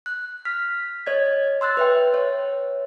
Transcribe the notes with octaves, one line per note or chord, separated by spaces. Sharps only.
F#6
F6 B6
C#5 D#5 G#6
C6 E6 F#6 A6
B4 E5 G5
C#5